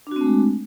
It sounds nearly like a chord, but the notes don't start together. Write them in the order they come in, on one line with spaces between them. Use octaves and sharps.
D4 F#4 C4 A3 G#3